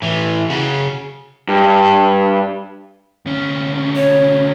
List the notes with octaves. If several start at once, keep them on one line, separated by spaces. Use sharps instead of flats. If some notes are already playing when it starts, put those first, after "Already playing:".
A2 E3
C#3 F#4
G2
D2 C#4
C#5